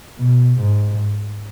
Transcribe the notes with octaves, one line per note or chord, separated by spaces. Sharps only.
B2
G#2